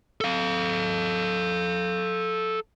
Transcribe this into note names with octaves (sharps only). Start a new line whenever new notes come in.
A4 F5